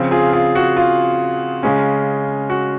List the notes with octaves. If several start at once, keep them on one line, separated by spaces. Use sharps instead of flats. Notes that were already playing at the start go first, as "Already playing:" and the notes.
Already playing: C#3 F3 C4
F4 G#4
F4 G#4
F#4
F4
C#3 G#3 C#4
F#4